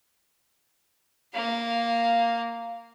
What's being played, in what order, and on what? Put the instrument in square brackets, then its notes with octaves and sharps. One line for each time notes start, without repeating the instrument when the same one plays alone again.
[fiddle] A#3 F5